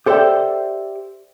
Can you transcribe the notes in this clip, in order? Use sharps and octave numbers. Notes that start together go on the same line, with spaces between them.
G4 A4 C5 D5 E5 G5